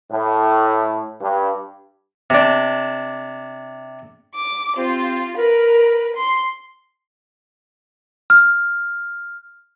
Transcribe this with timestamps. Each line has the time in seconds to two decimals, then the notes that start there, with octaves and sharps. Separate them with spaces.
0.11 A2
1.22 G2
2.30 C3 D4
4.35 D6
4.77 C4 F4 G4 C5
5.37 A#4 B4
6.16 C6
8.30 F6